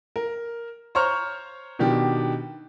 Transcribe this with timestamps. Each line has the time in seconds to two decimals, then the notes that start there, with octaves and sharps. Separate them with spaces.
0.16 A#4
0.95 C5 C#5 A#5 C#6 F6
1.79 B2 D#3 D4 G4